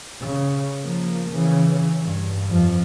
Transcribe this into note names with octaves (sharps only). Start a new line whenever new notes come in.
C#3
F3 A#3
C#3 E3
G2
F2 F3